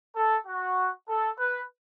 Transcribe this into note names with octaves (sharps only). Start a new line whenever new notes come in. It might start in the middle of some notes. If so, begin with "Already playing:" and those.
A4
F#4
A4
B4